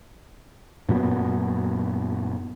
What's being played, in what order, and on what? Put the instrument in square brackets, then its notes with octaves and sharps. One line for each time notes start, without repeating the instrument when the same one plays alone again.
[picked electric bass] F#2 A#2 F#3 B3